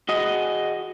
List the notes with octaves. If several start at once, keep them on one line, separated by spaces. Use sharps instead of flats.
F#4 G#4 D#5